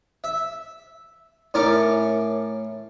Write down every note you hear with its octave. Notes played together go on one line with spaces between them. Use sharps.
E5
A2 C#4 A#4 D6